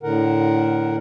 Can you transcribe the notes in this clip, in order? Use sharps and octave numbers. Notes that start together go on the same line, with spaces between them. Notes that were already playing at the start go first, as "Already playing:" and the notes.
A2 D3 A#4 F#5